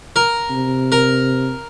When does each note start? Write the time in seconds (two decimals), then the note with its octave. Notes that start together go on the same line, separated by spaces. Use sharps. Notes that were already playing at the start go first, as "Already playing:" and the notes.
0.16 A#4
0.50 C3
0.92 A#4